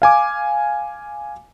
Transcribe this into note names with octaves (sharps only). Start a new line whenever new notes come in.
F5 G#5 D6